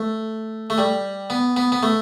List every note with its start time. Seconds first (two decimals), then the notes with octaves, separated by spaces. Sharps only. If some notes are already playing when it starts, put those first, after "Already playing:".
Already playing: A3
0.70 A3
0.78 G3
1.30 B3
1.57 B3
1.72 B3
1.83 A3